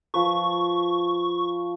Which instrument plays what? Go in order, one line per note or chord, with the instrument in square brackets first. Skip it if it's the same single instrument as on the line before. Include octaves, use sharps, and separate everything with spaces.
[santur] F3 B4 [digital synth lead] C#6